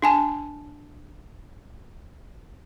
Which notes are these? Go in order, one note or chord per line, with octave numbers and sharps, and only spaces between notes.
D4 G#5 A5